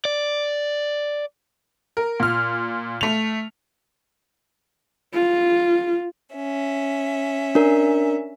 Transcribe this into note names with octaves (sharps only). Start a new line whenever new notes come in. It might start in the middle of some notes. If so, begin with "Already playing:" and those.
D5
A#4
A#2 F6
A3 F7
F4
C#4 E5
D4 A#4